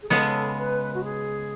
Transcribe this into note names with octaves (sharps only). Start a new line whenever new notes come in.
G#4
C#3 G#3 B3 A4
B4
F#4
G#4